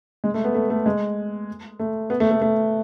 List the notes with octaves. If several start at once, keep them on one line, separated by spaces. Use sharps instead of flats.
G#3
A3
B3
A3
A3
G#3
A3
B3
A3
A3
A3